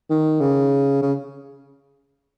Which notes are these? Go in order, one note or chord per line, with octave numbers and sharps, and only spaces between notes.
D#3
C#3
C#3